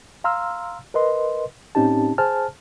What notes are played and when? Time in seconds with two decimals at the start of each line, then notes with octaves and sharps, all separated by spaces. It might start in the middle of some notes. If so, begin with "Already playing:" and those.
0.24 F5 A#5 C6 E6 F6
0.94 A#4 B4 D#5 C6
1.75 A2 C4 C#4 D#4 G4 A5
2.18 G#4 C5 G#5 A5 F6